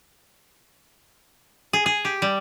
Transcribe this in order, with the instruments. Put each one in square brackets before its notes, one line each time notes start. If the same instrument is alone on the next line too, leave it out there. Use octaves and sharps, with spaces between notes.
[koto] G#4
G#4
G4
G3